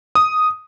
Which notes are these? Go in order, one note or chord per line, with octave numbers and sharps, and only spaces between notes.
D#6